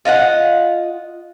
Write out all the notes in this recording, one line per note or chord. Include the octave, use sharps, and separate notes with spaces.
F4 D#5 F5 F#5